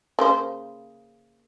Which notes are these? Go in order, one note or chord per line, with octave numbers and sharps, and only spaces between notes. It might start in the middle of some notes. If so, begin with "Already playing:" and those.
C#3 A#3 C5